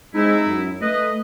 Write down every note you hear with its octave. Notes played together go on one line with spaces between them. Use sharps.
G#3 C4 D#4 E4
F#2
A3 B4 D#5